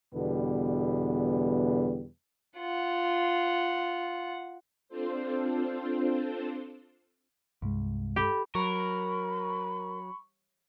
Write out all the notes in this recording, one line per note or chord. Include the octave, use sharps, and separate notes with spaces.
E2 B2 D3 G3 B3
F4 F#5
C4 D4 F4 A4 C5
C2 G2 G#3
G4 A4 B5
F#3 A#4 B5 C#6